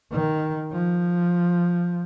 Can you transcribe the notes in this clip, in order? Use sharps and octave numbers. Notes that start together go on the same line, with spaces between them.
D#3
F3